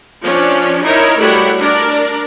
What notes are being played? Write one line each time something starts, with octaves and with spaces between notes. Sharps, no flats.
F3 C#4 D4
D#4 E4 A#4 C#5 E5
G3 A3 E4 F#4 C#5 F#5
D4 A#4 D5